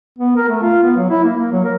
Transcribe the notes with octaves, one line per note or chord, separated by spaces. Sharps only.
B3
A#4
A3
F4
B3
F#3
E4
A#3
A#3
F#3
A#4